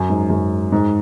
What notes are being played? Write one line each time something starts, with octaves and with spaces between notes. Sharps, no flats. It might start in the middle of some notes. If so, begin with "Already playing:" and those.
Already playing: F#2
G#2
F#2
G#2